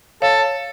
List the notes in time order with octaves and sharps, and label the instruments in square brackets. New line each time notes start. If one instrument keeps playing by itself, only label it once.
[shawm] A4 [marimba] C#5 F5